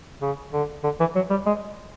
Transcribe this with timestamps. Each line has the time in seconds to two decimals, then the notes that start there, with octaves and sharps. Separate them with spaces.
0.22 C#3
0.53 D3
0.84 D3
1.00 E3
1.15 F#3
1.30 G3
1.46 G#3